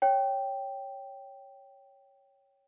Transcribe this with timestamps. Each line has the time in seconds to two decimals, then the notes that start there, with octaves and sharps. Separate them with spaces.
0.02 C#5 G5